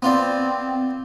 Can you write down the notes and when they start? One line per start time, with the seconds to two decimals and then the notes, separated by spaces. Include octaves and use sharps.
0.02 B3 C4 F4 D5